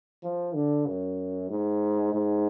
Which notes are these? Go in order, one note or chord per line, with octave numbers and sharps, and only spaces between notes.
F3
D3
F#2
G#2
G#2